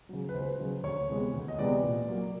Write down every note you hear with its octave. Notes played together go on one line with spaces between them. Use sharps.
C#3 F#3
B4
C#2 C5
C#3 F#3
D2 C#5
C3 E3 G#3 B3
D2
D#5
C3 E3 G#3 B3 D5
A#2
F#3 A#3